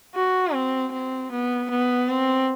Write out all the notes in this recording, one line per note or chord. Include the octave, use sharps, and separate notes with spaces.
F#4
C4
C4
B3
B3
C4